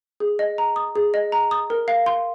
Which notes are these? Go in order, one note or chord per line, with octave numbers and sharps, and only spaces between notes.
G#4
D#5
A#5
D#6
G#4
D#5
A#5
D#6
A#4
F5
C6